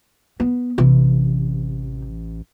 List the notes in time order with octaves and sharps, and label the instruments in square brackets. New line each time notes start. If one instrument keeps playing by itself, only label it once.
[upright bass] B3
[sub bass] A1 [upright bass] C3 E3